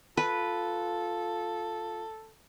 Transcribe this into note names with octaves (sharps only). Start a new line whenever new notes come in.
F4 A4 B4